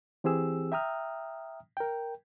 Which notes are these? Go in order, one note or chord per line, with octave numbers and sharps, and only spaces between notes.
E3 C4 G4 G#4 E6
E5 G5 A#5 D#6 F6
A#4 G5